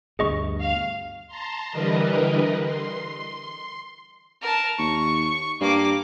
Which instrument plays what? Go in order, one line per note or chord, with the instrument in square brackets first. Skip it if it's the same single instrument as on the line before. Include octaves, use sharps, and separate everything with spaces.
[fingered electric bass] D2 G2 B2 [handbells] G#4 D#5 C#6
[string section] F5
[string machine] A5 A#5 C6
D3 E3 G3 A#4 B4 D#5
C6
[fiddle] A#4 A5
[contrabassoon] D#2 [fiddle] C#6
[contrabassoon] G2 [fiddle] A#3 D6